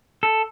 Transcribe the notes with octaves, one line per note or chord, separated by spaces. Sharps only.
A4